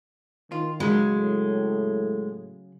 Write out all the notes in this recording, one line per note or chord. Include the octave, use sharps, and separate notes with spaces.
D#3 F4
C#3 F#3 G#3
A2